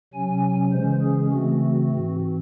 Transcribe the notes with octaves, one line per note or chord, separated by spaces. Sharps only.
C3 F#3 C#4 G#5
C#3 E3 G#3 C#4 C5
G#4
C#3 E3 A3 C4 F#4
G#2 E3 C4